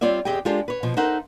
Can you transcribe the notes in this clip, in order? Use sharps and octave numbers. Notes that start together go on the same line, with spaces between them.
G3 C4 F4 C#5 D5 E5
E2 C4 G4 G#4 D#5 G5
G#3 D4 F4 G4 A4
B4 C#5
B2 F3
D#4 A4 A#4 C5 E5 F#5